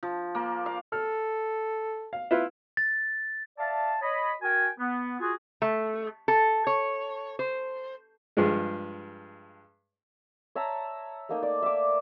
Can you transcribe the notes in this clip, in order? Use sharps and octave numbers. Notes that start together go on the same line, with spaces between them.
F3
A#3
F5
A4 F6
F5
E4 F4 B4
A6
D5 E5 F5 A5
C#5 D#5 B5
F#4 A#4 G5 G#5
B3
F4 F#4 G#4
A3
A4
C#5
C5
G2 F3 G#3
C#5 E5 A5 A#5
A3 A#3 D#4
D5
E5 D6